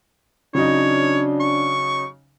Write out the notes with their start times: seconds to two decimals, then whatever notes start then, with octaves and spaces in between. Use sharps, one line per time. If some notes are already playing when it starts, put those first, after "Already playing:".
0.55 C#3 F#3 D4 D#4 C#5
1.40 C#6